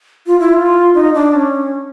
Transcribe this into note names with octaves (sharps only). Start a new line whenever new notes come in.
F4
E4
F4
D#4
D4
C#4